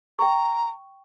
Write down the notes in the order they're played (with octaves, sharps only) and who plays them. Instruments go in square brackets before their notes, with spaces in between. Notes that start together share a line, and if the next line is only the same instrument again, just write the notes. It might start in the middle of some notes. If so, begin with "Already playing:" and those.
[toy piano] G5 C#6 [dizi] A#5